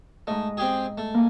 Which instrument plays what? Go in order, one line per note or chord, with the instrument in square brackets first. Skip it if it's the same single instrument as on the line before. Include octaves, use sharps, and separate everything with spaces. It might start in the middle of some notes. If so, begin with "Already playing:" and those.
[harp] G#2 D#5 [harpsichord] A3
[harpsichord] C4 G4 G#4
A3
[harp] A#3 G#5